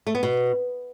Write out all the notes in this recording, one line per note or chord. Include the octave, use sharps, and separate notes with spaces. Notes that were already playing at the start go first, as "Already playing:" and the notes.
A3
B3
B2